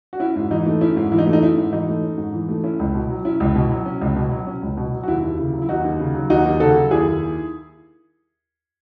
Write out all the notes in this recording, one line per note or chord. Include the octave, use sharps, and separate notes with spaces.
F#4
C#4 E4
G#2
E3 D#4
A3
C#4 E4
G#2
E3 E4
D#4
A3
D#4
C#4 E4
G#2
E3 D#4
A3
C#4
G#2
E3
A3
C#4 E4
C#2
B2
F#3
C#4 E4
C#2
B2
F#3
C#4
C#2
B2
F#3
C#4
C#2
B2
F#3
F#4
D#2 E4
D#2
C#3 E4
F#3
E4
D#2 D#4 F#4
D#2
C#3
F#3
D#2 D#4 F#4
D#2
C#3 F#4 A4
F#3
D#2 E4 G#4
D#2